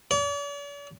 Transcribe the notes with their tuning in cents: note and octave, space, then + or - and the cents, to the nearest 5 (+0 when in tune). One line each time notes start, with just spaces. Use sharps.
D5 -45